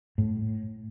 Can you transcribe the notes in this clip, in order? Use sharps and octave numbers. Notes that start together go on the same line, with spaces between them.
A2